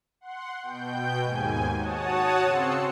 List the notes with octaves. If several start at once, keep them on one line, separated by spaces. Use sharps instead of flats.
F#5 C6
B2 G5 G6
D#2 G#2 G#5
F#4 C#5 F#5 A5 D#6
C#3 C4 C6 E6 F#6 C#7